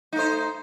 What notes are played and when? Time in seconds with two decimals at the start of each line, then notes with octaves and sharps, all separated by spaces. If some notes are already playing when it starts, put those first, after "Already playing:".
0.13 D#4
0.16 A3
0.19 C5